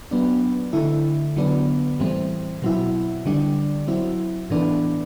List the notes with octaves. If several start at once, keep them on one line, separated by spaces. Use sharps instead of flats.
F#3 B3 D4
D3 A3 E4
D3 F#3 B3 D4
A2 E3 G3 C4
B2 F#3 C4 E4
D3 G3 D4
F#3 C4 E4
A2 E3 B3 D4